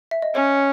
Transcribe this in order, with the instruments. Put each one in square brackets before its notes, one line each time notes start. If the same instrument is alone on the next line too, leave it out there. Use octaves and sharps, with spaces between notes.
[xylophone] E5
D#5
[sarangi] C#4 [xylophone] C#5